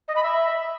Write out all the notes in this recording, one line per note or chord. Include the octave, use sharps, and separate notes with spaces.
D#5
B5
E5